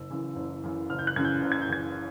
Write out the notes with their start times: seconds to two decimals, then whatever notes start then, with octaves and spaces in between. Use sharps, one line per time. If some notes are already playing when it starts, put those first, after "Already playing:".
Already playing: F#1 E6
0.10 F#2 C#3 E3
0.36 F#1
0.63 F#2 C#3 E3
0.89 F#1 F6
0.99 G6
1.07 F#6
1.16 F#2 C#3 E3 G#6
1.25 G6
1.42 F#1
1.52 G#6
1.62 G6
1.69 F#2 C#3 E3 G#6